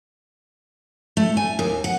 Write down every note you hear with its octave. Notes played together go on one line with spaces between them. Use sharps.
A3
G#5
D#2
F#5